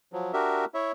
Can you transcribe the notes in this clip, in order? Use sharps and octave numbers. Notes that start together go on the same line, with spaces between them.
F3 F#3
D4 F#4 G4 A#4 E5
E4 C#5 E5